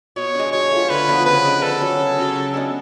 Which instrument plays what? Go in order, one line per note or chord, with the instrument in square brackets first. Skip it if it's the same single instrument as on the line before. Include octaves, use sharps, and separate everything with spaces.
[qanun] B2 [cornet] C#5
[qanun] G#3 D4
[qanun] F#3 [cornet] C#5
[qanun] A3 F4
[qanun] D3 [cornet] B4
[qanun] F3 B3 D4
[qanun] C#3 [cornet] B4
[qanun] G#3 D4
[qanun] D3 [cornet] A4
[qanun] F#3 C#4
C#3
F#3 C#4 F#4
C#3
G#3 B3 D4